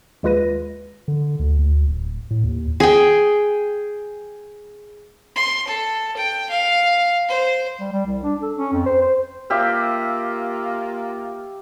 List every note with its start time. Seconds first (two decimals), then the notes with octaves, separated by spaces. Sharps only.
0.23 D#2 G#3 F4 B4 A#6 D#7
1.08 D3
1.39 D2
1.59 D2
1.88 D1
2.31 A2
2.44 D#2
2.80 G#4 G5
5.36 C6
5.67 A4
6.16 G5
6.50 F5
7.29 C5
7.80 G3
7.93 G3
8.06 C2
8.23 D4
8.42 A4
8.57 C#4
8.73 F2
8.86 C5
9.01 C5
9.50 A#3 F4 G4 E5 F5